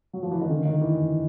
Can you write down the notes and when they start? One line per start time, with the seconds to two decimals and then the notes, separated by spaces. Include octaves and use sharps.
0.13 F#3
0.23 F3
0.31 E3
0.41 D#3
0.49 D3
0.65 D#3
0.81 E3